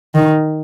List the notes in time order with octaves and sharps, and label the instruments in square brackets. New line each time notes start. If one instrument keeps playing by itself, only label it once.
[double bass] D#3